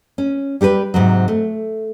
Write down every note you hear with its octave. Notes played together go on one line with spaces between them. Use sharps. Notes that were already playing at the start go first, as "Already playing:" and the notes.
C#4
G3 G4 A#4 B4
G#2 C3 F#3
A3